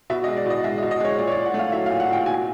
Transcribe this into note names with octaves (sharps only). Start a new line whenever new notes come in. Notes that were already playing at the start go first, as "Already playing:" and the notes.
B2 E5
D#5
G#3
D5
B2 D#5
G#3 E5
D#5
B2
D#5
G#3 C#5
A#2 D5
C#5
D5
A#2
F#5
A3
F5
F#3 E5
F5
A#2
F#5
A#2 G5
B2 G#5